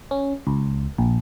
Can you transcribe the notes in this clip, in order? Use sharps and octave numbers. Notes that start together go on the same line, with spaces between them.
C#4
C#2
A#1